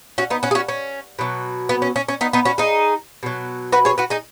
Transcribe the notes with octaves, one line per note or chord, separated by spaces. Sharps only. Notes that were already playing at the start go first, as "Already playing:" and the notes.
C#4 F#4
B3 D#4
C#4 F#4
G#4
C#4 F#4
C#4
B2 F#3
B3
C#4
C#4
C#4
B3 D#4
B3 D#4
C#4 F#4
D#4 G#4
B2 F#3
F#4 B4
G#4 C#5
F#4 B4
D#4 G#4